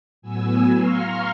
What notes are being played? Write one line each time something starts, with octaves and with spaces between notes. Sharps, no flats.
A2 F#3 B3 G#5 E6
F5 A#5 C6 C#6 F6